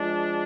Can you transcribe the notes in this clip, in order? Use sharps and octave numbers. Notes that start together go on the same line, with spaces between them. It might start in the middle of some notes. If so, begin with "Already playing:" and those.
Already playing: F3 G#3 D4